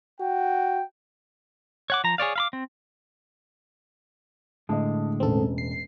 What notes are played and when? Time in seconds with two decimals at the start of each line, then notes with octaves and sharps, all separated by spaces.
0.21 F#4 G5
1.90 C#5 F#5 D6
2.04 F3 A#5
2.18 G#4 C#5 D5 F5
2.36 F5 B5 D6
2.53 C4
4.69 A2 D3 G#3 D#5 A5
5.20 E1 A1 C4 A4
5.58 C7